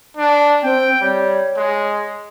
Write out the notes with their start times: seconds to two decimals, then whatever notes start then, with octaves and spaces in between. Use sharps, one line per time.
0.17 D4
0.63 C4 G5
1.01 G3 C#5
1.57 G#3